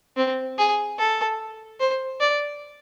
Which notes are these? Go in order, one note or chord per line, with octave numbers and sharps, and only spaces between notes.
C4
G#4
A4
C5
D5